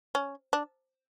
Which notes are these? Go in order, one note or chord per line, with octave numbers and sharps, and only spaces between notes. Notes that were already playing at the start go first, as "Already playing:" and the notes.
C#4
D4